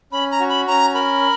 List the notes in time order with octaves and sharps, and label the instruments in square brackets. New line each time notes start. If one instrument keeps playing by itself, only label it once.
[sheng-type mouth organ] C#4 [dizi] B5
[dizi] A#5
[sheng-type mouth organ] F#4
[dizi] B5
[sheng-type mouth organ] C#4 [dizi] A#5
[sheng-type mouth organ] A#4 [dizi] B5